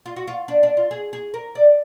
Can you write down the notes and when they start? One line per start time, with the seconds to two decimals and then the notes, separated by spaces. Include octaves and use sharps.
0.06 F4
0.16 F#4
0.27 F4
0.48 D4
0.63 D4
0.77 F4
0.91 G#4
1.13 G#4
1.34 A#4
1.55 D5